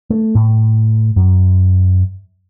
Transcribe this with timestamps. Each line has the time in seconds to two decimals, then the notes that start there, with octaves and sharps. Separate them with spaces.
0.10 A3
0.35 A2
1.16 F#2